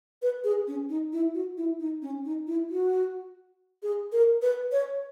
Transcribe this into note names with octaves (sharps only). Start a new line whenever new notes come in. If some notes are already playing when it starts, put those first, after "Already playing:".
B4
G#4
C#4
D#4
E4
F#4
E4
D#4
C#4
D#4
E4
F#4
G#4
A#4
B4
C#5